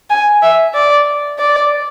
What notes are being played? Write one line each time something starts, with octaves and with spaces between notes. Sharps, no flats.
G#5
E5
D5
D5